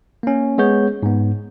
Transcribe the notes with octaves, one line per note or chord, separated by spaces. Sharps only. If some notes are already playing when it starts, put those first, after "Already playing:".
A#3 C#4
G#3 B3 G#4 C#5 G6
G#2 B3